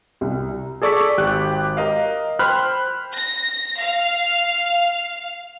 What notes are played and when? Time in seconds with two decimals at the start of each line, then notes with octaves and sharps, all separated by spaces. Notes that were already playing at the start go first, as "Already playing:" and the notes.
0.21 C2
0.82 G#4 A4 D5 C#6 E6 B6
1.17 G#1 G4 F#6
1.77 A#4 D#5 F5
2.39 C5 G5 B5 F6 F#6
3.15 A#6
3.80 F5